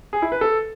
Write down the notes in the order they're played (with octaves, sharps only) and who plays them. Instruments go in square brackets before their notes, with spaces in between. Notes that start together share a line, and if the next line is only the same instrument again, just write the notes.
[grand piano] G#4
E4
B4
A4